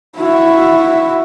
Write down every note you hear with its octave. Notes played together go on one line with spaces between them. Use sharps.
E4 F#4